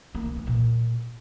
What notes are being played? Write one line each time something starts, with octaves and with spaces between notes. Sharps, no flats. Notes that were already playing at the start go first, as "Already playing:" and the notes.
A#3
D3
E3
A#2